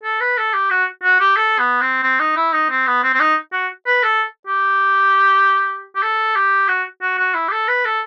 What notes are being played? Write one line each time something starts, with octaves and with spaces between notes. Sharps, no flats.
A4
B4
A4
G4
F#4
F#4
G4
A4
B3
C4
C4
D#4
E4
D#4
C4
B3
C4
C4
D#4
F#4
B4
A4
G4
G4
A4
G4
F#4
F#4
F#4
E4
G4
A4
B4
A4